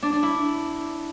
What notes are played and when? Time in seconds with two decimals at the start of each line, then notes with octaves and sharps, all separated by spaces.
0.03 D4
0.13 D4
0.23 E4